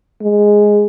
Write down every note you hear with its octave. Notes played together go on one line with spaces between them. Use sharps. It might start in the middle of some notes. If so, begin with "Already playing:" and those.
G#3